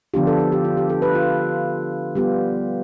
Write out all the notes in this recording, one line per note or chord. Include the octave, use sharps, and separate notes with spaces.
D3 F3 B3 D4 F4 G4
A4
A4
G4
F4
G4
A4
B4
F4
G3 B3 F4 G4